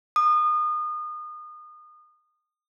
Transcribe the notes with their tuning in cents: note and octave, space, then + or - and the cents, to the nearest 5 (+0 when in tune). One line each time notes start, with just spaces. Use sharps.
D#6 -30